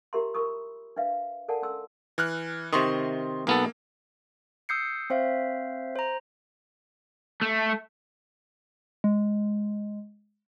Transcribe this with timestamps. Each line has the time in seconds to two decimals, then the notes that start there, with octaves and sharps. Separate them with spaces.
0.13 F4 G4 A#4 E5 A#5 C6
0.34 F4 A#4 B5 C#6 D#6 E6
0.96 D4 B4 E5 F5
1.48 A4 A#4 D5 F#5 G#5 A5
1.62 C#4 A4 C6 E6
2.18 E3 F6 F#6
2.73 C3 D#3 C6 C#6 D#6
3.47 B1 A#3 B3 A4
4.69 D#6 E6 G6 C7 C#7
5.10 C4 C5 E5 F5
5.96 C5 A#5
7.42 A3
9.04 G#3